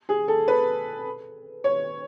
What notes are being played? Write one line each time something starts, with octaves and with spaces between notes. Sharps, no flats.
G#4
A4
B4
C#5